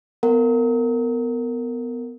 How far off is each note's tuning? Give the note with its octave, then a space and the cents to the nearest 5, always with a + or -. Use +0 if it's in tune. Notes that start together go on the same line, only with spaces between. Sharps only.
B3 +15 A#4 -25 F#5 +0